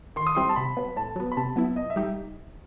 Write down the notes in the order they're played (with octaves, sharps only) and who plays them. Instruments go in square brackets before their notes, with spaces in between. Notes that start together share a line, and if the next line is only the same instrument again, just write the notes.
[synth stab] D#3 [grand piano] C6
[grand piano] D#6
[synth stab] G3 C4 E4 G4 [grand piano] C6
[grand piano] A5
[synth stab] C3 [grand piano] B5
[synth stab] F#3 B3
[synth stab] A2 [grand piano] A5
[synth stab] F#3 B3
[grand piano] B5
[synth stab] C3 [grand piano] A5
[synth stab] F#3 B3 E4
[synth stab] B2 [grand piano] D#5
[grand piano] E5
[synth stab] G3 D#4 G4